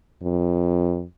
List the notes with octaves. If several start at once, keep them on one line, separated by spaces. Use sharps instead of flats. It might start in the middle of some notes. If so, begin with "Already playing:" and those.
F2